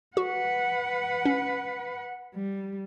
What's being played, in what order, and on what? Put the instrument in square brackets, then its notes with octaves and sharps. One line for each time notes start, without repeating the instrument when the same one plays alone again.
[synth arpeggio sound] F#4 [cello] B4 F#5
[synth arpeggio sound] C#4
[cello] G3